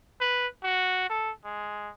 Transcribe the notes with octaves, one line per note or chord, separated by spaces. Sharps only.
B4
F#4
A4
G#3